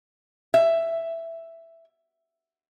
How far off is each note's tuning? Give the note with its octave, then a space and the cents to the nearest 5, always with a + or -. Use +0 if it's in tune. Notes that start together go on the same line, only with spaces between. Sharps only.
E5 +5